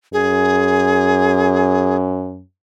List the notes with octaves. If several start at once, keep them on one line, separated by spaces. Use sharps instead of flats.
F#2 G#4